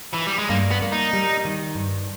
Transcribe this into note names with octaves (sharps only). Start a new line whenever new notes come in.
E3
G3
G#3
G2 A#3
B3
A#3
D#4
G3
D#3
G2